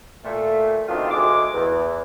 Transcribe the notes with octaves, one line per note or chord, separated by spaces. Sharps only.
A#2 A3
B2 D3 D#3 C4 D4 F4
D2 G#3 D6
E2